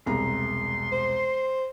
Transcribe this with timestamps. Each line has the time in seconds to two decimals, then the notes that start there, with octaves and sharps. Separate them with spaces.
0.06 E1 C2 A#5 C6
0.92 C5